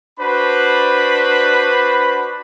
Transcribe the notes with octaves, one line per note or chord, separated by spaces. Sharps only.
D4 F#4 B4 C5 B5